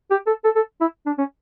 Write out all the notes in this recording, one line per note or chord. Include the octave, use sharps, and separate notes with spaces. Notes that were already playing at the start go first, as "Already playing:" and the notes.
G4
A4
A4
A4
E4
D4
C#4